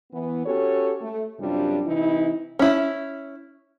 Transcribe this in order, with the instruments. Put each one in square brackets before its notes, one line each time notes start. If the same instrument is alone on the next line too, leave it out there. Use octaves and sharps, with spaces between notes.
[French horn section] E3 B3
C#4 F#4 G4 A4 C#5
A3
F#2 C3 G3 D4 F4
C3 E3 D#4 E4
[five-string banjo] C#4 E4